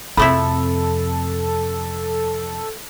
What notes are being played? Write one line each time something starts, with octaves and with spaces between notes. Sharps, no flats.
F2 C3 F3 A3 E4 A4 B5